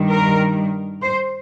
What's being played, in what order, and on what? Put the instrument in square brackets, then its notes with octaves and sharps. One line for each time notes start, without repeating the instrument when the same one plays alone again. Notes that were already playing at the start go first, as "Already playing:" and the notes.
Already playing: [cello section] G2 D#3 G3
A#4
C5